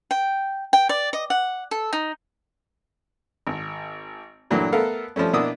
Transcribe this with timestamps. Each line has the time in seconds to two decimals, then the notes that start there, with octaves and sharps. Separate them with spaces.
0.11 G5
0.73 G5
0.89 D5
1.13 D#5
1.30 F#5
1.71 A4
1.93 D#4
3.47 G#1
4.50 G2 A#2 E3 F#3 A3
4.72 A3 B3 A4 A#4 F5
5.16 F3 G3 A3 C#4
5.33 B2 A#3 D4 E4 D#6 E6